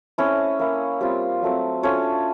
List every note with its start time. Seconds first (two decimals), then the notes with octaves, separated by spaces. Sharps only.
0.18 A3 C4 C#4 E4 C#5
0.59 A#3 C#4 E4
1.01 G3 C4 F4
1.42 F#3 A3 C4
1.83 A3 C#4 D4 F4 C#5